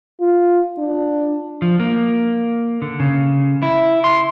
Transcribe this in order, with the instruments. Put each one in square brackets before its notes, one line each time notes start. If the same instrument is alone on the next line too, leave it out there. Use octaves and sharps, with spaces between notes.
[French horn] F4
D4
[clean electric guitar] F3
A#3
D3
C#3
E4
C6